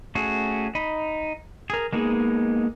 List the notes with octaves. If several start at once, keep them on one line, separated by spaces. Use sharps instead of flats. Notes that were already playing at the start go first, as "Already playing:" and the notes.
A3 C#4 F#4 G#4
D#4 D#5 B5
G#4 A#4
G#3 A#3 B3 D#4 G#4